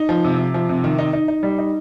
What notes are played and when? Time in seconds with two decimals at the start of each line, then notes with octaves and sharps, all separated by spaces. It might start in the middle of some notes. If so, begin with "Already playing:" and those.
Already playing: D#4
0.09 F3
0.24 C3
0.38 C3
0.54 F3
0.69 C3
0.84 D#3
0.99 D#4
1.13 D#4
1.28 D#4
1.43 G3
1.58 D#4